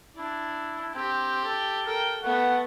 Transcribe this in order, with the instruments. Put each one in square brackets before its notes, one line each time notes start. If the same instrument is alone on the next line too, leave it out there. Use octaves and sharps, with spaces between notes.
[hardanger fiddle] D4 [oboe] E4
[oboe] C4 [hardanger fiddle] G4
[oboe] A4
[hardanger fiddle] A4 G5 [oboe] A#4
[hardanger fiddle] A3 B3 [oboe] F#5